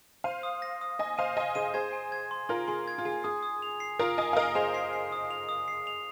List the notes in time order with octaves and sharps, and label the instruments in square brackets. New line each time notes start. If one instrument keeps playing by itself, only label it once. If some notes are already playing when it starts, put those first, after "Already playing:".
[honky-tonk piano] C5 F5 [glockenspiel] D#7
[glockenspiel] D#6
A#6
D#6
[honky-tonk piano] D#5 G#5 [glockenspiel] A#6
[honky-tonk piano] C5 F5 [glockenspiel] D#7
[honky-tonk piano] D#5 G#5 [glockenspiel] D#7
[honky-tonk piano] G#4 C5 [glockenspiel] D#7
[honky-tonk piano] G#4 C5 [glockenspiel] G#6
[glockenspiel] G#5
G#6
C6
[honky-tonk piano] F4 A#4 [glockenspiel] C6
[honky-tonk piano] G#4 [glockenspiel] C6
[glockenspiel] G#6
[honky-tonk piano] F4
[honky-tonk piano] G#4 [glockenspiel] G#5
[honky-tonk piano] G#4 [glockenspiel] D#6
[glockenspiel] D#6
F7
C7
[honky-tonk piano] F4 A#4 [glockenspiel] D#6
[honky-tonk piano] D#5 G#5 [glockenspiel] D#6
[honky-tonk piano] F5
[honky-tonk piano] A#4 D#5 [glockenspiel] D#6
[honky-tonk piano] G#4 C5 [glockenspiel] F7
[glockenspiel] C7
C7
D#6
F7
D#6
C7
F7